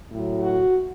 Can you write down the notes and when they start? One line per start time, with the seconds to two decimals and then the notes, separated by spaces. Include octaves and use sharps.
0.10 A2 F#3
0.41 F#4